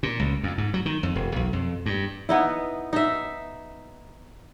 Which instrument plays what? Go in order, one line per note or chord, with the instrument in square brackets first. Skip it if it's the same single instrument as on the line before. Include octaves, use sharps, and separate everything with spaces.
[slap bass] A#2
C#2
F2
G#2
F#3
D#3
F2
E1
B1
F2
G2
[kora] B3 D#4 E4
D#4 E5